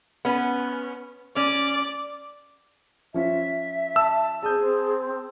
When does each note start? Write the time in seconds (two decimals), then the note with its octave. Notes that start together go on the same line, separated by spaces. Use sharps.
0.25 B3 C#4
1.36 C#4 D5
3.14 F3 C#4 F4 E5
3.96 A5 E6
4.43 C4 G#4 A5 D#6 G6
4.59 C4